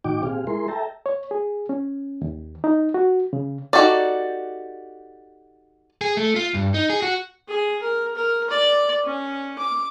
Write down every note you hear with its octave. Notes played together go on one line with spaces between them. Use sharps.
A2 D#3 D#4 F#4 G5 D6
A#2 C4 G4 G#4 F5
G#3 E4 G#4 A#4 C6
A4 E5 G5 A5 A#5
C#5
G#4
C#4
D#2
D#4
F#4
C#3
D#4 F#4 G4 A4 D5
G#4
A3
F4
G2
D#4
G#4
F#4
G#4
A#4
A#4
D5
C#4
D6